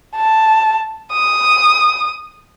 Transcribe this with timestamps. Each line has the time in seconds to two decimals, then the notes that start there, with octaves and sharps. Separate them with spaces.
0.17 A5
1.13 D#6